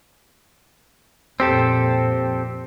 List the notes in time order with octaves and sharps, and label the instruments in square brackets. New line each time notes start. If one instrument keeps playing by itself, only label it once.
[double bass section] F2 A#2 [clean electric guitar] C4 G4 A4